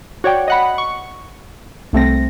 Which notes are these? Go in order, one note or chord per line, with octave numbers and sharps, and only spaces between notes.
F#4 C#5 D5 G5
D#5 F#5 B5
C#6
C2 A3 C4 A#6